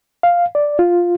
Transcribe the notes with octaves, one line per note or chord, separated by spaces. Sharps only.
F5
D5
F4